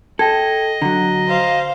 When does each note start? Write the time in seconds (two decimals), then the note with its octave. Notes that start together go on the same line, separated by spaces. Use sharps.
0.19 A4 D#5 G5 G#6
0.82 D3 F#3 A#5
1.27 C5 F5